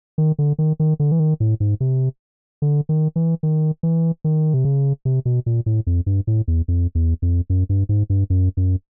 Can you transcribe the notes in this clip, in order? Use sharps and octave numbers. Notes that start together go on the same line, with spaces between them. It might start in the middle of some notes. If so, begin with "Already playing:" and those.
D#3
D3
D#3
D#3
D3
E3
D#3
A2
G#2
C3
D3
D#3
E3
D#3
E3
D#3
C3
C#3
C3
B2
A#2
A2
F2
G2
A2
E2
F2
E2
F2
F#2
G2
G#2
G2
F#2
F#2